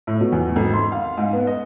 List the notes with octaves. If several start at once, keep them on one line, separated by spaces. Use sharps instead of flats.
A2
B2
E2
G#1
C6
F5
G#2
B3
D#5